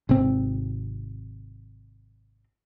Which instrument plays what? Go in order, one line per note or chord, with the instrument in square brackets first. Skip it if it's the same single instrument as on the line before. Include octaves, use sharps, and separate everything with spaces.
[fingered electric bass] G#1 C3 C4